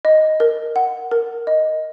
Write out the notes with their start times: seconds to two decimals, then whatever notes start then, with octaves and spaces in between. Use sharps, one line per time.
0.05 D#5
0.40 A#4
0.76 F#5
1.11 A#4
1.47 D#5